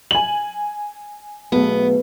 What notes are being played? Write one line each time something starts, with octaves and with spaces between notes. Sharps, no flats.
G#5 F#7
B1 A3 B3 G#4